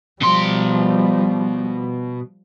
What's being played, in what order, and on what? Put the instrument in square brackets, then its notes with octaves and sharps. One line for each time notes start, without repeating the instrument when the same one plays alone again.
[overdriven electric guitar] B2 C6 [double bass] F3 G3